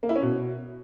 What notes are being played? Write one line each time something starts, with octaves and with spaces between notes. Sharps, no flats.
A#3
E4
C#4
B2